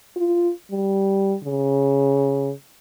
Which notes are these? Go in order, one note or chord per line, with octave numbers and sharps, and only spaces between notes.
F4
G3
C#3